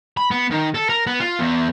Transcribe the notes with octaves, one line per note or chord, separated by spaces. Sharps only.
B5
B3
D#3
A4
A#4
B3
F4
E2